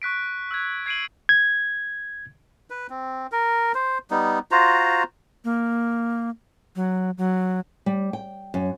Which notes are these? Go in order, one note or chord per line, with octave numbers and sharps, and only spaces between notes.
C#6 F#6 B6 D7
E6 F#6 G#6
G#6 C7 D7 D#7 F#7
G#6
B4
C4
A#4
C5
G3 B3 D#4
F4 F#4 C5 A#5
A#3
F#3
F#3
G3
G5
F#2